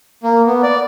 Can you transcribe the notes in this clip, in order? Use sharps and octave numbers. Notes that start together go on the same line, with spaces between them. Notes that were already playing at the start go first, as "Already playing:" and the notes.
A#3
B3
D5